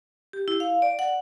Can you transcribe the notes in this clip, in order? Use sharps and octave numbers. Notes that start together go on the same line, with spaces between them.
G4
E4
F5
D5
F#5